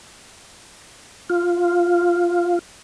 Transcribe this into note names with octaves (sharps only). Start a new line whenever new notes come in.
F4